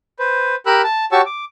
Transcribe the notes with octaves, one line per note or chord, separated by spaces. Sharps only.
B4 C5
G4 A#4 B5 E6 F#6
A5
F#4 G4 C#5 A5 C#6 E6
D6